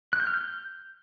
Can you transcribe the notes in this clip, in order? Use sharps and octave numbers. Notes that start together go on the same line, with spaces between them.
F#6
G6
F6
G6